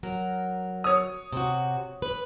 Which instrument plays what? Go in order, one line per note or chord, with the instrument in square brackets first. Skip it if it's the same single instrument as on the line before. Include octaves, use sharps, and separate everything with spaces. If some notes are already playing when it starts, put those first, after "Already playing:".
[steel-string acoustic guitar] F#3 A#4
[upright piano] C#5 D#6
[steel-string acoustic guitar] C3 F#4
B4